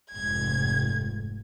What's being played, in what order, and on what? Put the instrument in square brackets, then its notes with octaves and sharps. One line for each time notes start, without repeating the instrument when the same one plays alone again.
[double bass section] F1 G#2 [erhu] G#6